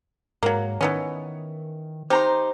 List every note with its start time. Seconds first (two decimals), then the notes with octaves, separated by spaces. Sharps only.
0.43 G#2 F#3 A#3
0.81 D#3 E3 B3 C#4
2.10 D#4 G4 C5 A#5 C6